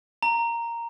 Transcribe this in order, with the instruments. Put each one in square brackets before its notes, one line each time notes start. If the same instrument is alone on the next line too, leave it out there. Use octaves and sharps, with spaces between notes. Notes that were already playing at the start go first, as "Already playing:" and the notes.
[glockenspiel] A#5